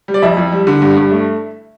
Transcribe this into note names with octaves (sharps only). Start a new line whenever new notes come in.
G3
D5
F2 E4 E5
F2
G3
D3
G2
G2
A3